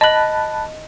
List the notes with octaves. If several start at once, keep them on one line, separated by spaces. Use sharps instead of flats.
D#5 A5 B5 F#6 F#7